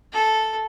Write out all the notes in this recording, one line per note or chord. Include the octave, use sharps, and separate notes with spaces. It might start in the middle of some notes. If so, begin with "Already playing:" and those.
A4